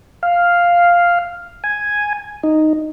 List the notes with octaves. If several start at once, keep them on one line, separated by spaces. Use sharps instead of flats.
F5
G#5
D#4